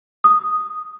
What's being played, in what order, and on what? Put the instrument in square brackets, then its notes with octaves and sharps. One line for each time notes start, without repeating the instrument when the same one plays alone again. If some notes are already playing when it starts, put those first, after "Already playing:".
[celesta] D#6